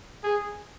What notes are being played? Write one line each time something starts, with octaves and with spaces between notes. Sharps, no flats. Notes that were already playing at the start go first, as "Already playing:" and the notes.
G#4